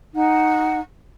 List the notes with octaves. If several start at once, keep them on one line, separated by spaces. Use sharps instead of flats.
D#4 F#5